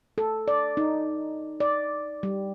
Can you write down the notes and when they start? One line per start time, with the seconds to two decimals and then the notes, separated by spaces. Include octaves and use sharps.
0.18 A4
0.48 D5
0.77 D#4
1.60 D5
2.23 G3